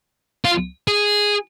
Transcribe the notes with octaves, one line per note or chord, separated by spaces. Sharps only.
F4
G#4